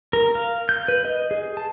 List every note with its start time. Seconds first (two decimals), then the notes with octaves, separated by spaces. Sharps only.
0.13 A#4
0.35 F5
0.69 G6
0.88 B4
1.05 D#5
1.31 G#4
1.57 A5